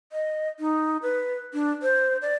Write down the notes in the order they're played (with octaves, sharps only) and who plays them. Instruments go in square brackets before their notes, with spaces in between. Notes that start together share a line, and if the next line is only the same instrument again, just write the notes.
[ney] D#5
D#4
B4
D4
C5
D5